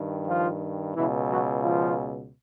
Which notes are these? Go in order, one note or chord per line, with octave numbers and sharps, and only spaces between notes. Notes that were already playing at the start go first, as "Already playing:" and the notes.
Already playing: G2 D#3
F3 F4
C#2 B2 E3 E4
F#3 F#4
F3 F4